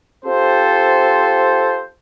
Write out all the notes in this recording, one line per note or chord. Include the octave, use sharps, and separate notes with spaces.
C4 F4 G4 A4 C5